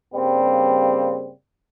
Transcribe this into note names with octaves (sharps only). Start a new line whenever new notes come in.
G2 C#3 G3 A#3 C4